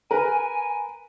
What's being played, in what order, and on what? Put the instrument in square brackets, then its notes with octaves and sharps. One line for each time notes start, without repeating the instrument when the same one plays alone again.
[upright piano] A#4 B4 [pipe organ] G#5